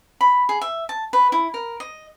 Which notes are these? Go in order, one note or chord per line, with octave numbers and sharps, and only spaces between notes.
B5
G#4
E5
A5
B4
E4
A#4
D#5